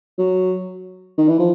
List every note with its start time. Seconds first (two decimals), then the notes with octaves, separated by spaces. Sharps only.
0.19 F#3
1.18 D#3
1.29 E3
1.39 F3